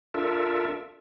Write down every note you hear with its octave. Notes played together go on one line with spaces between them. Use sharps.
D4 F4 A4 A#4 E5